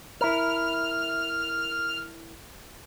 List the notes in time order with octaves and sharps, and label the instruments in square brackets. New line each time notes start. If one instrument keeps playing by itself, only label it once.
[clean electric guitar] E4 A#4 [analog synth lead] F6